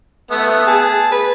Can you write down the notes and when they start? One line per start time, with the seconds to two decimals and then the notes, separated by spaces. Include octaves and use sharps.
0.31 A3 B3 D#6
0.67 G#4 A5
1.12 B4